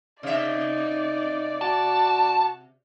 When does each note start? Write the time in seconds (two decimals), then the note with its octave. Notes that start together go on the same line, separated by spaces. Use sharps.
0.23 C3 D#4 D5 E5
1.61 F#4 A5